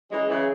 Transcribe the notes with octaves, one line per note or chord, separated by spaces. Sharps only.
E3 F#3 G#3 C#4 G#4
C#3 E3